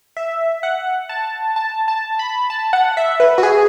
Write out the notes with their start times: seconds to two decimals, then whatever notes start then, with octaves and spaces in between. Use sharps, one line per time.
0.17 E5
0.63 F#5
1.09 A5
1.56 A5
1.88 A5
2.19 B5
2.50 A5
2.73 F#5
2.97 E5
3.20 B4
3.38 F#4
3.43 G#4